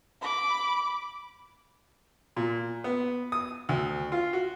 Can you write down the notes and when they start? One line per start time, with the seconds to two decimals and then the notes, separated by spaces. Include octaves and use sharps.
0.21 B5 D6
2.36 A#2
2.84 B3
3.32 D#6
3.69 D2
4.12 F4
4.33 F#4